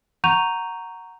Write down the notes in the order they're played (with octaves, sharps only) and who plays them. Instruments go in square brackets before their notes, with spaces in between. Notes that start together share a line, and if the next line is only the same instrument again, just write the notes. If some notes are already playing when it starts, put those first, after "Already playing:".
[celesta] F#5 A#5 C#6 G6 D#7 F7